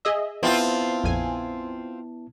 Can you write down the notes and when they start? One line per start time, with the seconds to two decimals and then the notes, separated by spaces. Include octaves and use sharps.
0.05 G#4 D#5 E5
0.43 B3 C4 E4 F4 A5
1.04 A#1 F2 G#5